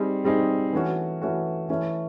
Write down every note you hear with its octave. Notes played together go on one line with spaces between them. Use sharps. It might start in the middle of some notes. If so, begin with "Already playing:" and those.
Already playing: G3 C4 D#4 G#4
G3 C4 D#4 G#4
E3 A3 C#4 F#4
E3 A3 C#4 F#4
E3 A3 C#4 E4